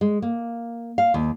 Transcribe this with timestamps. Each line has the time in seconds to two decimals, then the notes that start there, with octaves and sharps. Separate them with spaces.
0.01 G#3
0.22 A#3
0.98 F5
1.14 D#2